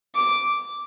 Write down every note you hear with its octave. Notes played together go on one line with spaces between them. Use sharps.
D6